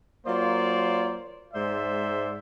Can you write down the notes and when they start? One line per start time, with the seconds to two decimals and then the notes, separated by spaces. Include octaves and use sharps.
0.25 F#3 A#3 F4 C5 D5
1.54 G#2 G#3 C5 D5 E5